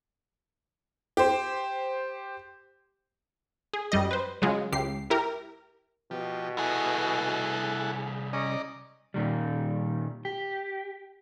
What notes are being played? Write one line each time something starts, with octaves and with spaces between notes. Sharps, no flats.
G4 C5
G#4
F#2 G3 D#5
B4 C5
C#3 F#3 G#3 F4
C#2 G4 C7
E4 G4 A#4 A#5
B2 F3 G4
C2 E4 G#4 A4 F#5
C#4 D5 D#5 A#5
A#2 D#3 G3
G4